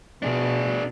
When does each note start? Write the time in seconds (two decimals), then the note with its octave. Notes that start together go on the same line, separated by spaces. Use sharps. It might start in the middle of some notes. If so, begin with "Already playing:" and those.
0.23 B2 D4 G#4